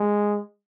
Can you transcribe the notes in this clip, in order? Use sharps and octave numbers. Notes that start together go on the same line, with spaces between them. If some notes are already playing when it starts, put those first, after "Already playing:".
Already playing: G#3